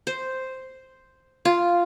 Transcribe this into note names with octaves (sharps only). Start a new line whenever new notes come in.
C5
F4